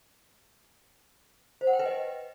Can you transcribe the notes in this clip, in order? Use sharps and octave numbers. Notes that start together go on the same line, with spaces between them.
C5
F#5
G5
B4
D#5